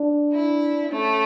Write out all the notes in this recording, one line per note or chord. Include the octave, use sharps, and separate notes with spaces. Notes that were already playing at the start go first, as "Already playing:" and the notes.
Already playing: D4
E4
A3 C#4